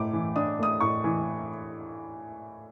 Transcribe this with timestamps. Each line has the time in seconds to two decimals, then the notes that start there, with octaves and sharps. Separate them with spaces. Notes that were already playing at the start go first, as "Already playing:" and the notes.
Already playing: A2 A3 D6
0.13 E3
0.36 D4 D#6
0.59 A3 D#6
0.80 A2 C#6
1.04 E3